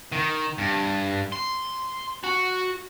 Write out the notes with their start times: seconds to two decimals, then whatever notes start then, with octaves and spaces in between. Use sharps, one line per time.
0.12 D#3
0.58 G2
1.32 C6
2.24 F#4